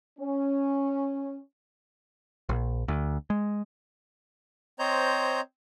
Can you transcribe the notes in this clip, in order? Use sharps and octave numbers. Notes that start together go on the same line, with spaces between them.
C#4
A#1
D2
G#3
C4 C5 C#5 D#5 A#5 G6